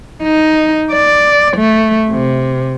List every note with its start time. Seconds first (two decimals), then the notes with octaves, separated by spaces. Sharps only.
0.23 D#4
0.92 D5
1.57 A3
2.10 C3